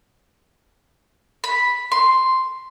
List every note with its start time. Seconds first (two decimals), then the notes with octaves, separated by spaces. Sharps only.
1.44 B5
1.92 C6